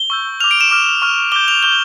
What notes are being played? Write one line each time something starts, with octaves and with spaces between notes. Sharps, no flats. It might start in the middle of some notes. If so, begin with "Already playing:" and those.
Already playing: G7
C#6 E6 G6
D6 F6 F7
D7
E7
D6 F6
C#6 F6
D6 G6 G7
F7
D6 G6 G7